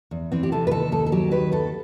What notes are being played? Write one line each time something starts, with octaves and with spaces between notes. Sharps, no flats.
E2
E3 C4
G4
C3 A4
B4
D#2 A4
D#2 A4
A4
F#3 G4
D#3 B4
D#2 A4